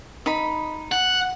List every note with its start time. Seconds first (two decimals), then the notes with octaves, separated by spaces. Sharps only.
0.26 D#4 B5
0.92 F#5